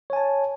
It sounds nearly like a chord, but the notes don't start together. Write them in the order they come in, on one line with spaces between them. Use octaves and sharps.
C#5 G#5 A5